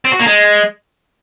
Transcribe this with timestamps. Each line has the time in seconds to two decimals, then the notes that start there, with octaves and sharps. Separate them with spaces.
0.05 C4
0.12 F#4
0.20 A#3
0.27 G#3